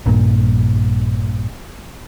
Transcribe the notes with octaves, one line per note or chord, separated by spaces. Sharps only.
A#1 G2 A#2